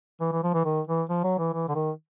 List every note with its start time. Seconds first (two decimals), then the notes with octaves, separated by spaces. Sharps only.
0.21 E3
0.32 E3
0.43 F3
0.54 E3
0.65 D#3
0.87 E3
1.09 F3
1.24 F#3
1.39 E3
1.53 E3
1.69 D3
1.75 D#3